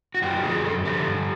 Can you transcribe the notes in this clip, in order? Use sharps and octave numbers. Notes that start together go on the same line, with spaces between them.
F#4
F#2 F4 G4
D3 F3 F#4 G#4
F#2 A4
D3 F3 G4 A4
G2